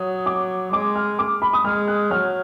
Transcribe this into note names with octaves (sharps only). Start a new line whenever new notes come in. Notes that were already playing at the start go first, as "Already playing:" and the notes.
Already playing: F#3 D#6
D6
G#3 D6
F6
D6
B5
D#6
G#3 F6
F#6
F#3 F6